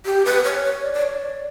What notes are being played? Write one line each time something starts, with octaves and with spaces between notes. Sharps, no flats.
G4
B4
C#5
C#5
D5
D5
C#5
D5